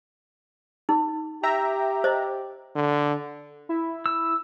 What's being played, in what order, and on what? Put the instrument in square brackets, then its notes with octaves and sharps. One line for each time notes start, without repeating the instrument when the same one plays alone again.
[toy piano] D#4
[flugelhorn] G4 [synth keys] E5 G5 A#5
[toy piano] C5 D#5
[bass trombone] D3
[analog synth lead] E4
[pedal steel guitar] E6